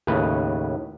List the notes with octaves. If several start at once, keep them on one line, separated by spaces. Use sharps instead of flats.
D#2 A2 C#3 B4